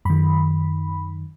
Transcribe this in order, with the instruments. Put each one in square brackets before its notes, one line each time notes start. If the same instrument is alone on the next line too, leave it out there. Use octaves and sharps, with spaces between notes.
[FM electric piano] F#2 D#3 B5